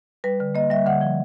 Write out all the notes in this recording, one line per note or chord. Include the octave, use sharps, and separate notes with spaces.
G3 B4
D3
A#3 D#5
G3 E5
D3 F#5
F3